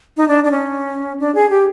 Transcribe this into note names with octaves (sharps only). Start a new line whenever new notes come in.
D#4
D4
D4
C#4
D4
G#4
G4